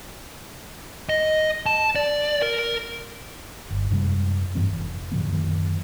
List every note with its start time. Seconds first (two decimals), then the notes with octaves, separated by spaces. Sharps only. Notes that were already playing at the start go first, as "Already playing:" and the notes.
1.09 D#5
1.66 A5
1.96 D5
2.42 A#4
3.71 G1
3.91 F#2 C3 G3 G#3
4.55 G2 E3 C4
4.70 F1
5.12 A2 D3 F3 B3
5.32 F#2 D#3 F#3 A#3